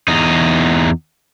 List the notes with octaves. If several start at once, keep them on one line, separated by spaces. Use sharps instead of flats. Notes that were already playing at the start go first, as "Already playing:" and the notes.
E2 D#4